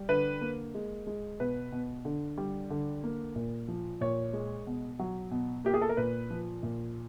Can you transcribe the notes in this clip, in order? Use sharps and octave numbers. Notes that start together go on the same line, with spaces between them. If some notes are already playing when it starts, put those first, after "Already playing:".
Already playing: G3
D3 B4
A#3
G#3
G#3
B2 B4
B2
D3
G3
D3
A#3
A#2
F3
A#2 C#5
G#3
B2
F#3
B2
A#3 G4
G#4
A4
A#4
A#2 B4
F3
A#2